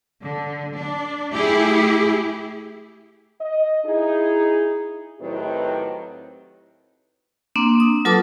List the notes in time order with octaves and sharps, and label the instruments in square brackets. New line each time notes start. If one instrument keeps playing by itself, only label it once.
[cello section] D3
D4
A3 E4 G4 G#4
[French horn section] D#5
D#4 E4 G#4
A2 D#3 F#3 C4 G4 B4
[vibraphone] A#3 C4 D4
D#6
F#3 F4 A4 B4 A5 D6